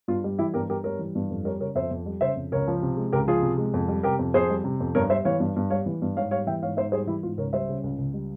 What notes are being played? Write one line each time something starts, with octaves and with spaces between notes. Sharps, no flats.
G2 F4
G3
E3 E4 G4
G2 G4 A#4
G2 G4 A#4
G3 A#4 C#5
E3
G2
F2
G3 A#4 C#5
C#3 A#4 C#5
F2 C5 E5
F2
G3
C#3 C5 E5
F2
C#2 A#4 C#5
F3
C3
G#3
C#2 G4 A#4
F3 F4 G#4
C3
G#3
F2
G3
C3 G4 A#4
F2
F2 G#4 C5
G3
C3
F2
G2 A#4 C#5
G3 C5 E5
E3 C#5 F5
G2
G2
G3 C#5 F5
E3
G2
G#2 C#5 F5
G3 C#5 F5
E3 E5 G5
G#2 C#5 F5
G#2 C5 E5
G3 G#4 C5
E3 E4 G4
G#2 F4
C#2 A#4 C#5
G3 C5 E5
C#3
C#2
C#2
G3